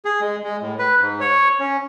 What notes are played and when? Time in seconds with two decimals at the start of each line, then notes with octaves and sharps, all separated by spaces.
0.05 G#4
0.21 G#3
0.44 G#3
0.62 A2
0.79 B4
1.01 G#2
1.20 C#5
1.60 C#4